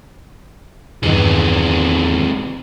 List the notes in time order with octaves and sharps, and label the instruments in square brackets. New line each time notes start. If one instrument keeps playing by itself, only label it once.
[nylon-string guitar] E2 G2 D#3 [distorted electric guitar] C3 G#3